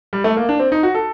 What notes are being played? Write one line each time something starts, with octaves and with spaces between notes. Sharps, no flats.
G3
A3
A#3
D4
C4
D#4
F#4
A4